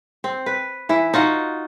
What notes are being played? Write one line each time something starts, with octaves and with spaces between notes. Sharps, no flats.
C4
B4
E3 E4
D#4 F4 F#4 F#5